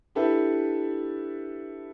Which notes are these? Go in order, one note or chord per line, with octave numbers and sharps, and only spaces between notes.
D4 E4 G4 A4 B4 E5